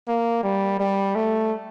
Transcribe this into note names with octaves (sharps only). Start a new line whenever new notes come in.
A#3
G3
G3
A3